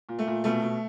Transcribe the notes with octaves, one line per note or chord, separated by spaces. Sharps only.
A#2
A3
A#2
B2 A3
B2